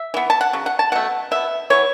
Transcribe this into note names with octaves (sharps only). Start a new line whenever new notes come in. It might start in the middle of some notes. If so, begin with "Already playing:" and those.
Already playing: E5
E3 B3
A5
F#5
C#3 F#3
F#5
A5
B2 A3 F#5
B2 B3 E5
E3 B3 C#5